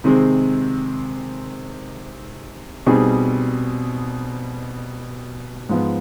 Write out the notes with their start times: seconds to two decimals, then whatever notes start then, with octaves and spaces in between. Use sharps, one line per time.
0.04 C3 D#3 G#3 C4
2.87 B2 G3 C4 D#4 G#4
5.69 G#2 F3 B3